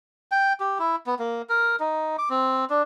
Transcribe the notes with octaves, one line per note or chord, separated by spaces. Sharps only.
G5
G4
E4
B3
A#3
A#4
D#4
D6
C4
D4